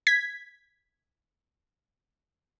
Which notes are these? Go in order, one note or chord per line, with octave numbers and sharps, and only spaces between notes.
G#6 B6